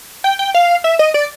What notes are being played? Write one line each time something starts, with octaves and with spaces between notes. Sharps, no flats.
G5
G5
F5
E5
D#5
D5